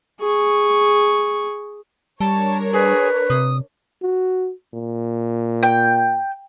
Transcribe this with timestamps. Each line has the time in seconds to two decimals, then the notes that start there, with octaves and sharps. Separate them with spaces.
0.20 G#4 C#6
2.20 G3 D4 A#4 C#5 A5
2.73 G#4 B4
3.30 C3 D#6
4.03 F#4
4.74 A#2
5.63 G5